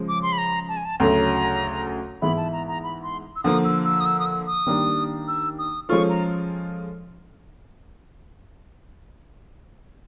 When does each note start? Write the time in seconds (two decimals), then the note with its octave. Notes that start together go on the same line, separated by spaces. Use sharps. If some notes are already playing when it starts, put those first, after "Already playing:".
Already playing: C#3 F3 G#3
0.08 D6
0.23 C6
0.33 B5
0.38 A#5
0.69 A5
0.77 G#5
0.85 A5
1.00 D2 C#3 F#3 A3 A#5
2.22 G#2 E3 G#3 B3 E4 B5
2.37 A5
2.52 A#5
2.68 A#5
2.84 B5
3.03 C6
3.36 E6
3.44 D3 F3 A#3 D#6
3.64 E6
3.85 E6
4.00 D#6
4.06 E6
4.20 D#6
4.26 E6
4.47 D#6
4.67 D#3 G3 A#3 D4 G4
5.28 E6
5.59 D#6
5.89 F3 G#3 C#4 F4 A4 C#6
6.09 A#5